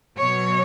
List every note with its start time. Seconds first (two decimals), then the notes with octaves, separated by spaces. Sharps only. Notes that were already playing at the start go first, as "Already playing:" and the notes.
0.17 B2 F#3 C#5